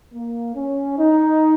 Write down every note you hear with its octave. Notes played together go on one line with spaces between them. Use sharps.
A#3
C#4
D#4